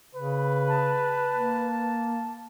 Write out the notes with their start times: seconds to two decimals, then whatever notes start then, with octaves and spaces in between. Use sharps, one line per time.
0.15 C#3 B4
0.69 A5
1.33 A#3